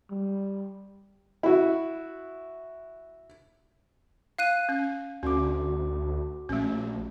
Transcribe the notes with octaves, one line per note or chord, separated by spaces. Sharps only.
G3
E4 F#4
F5 F#6 D#7
C#4
D2 C#4 F#4 D6
A#1 A3 C#4